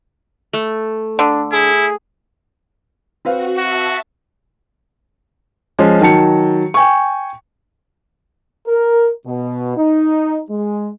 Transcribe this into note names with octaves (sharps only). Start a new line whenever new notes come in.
A3
D3 D4
E4 G#4
C4 F#4 B4 F5
F#4 E5 A5
F3 G#3 C#4
D#3 F#3 A5 C#7
G5 G#5 C#6
A#4
B2
D#4
G#3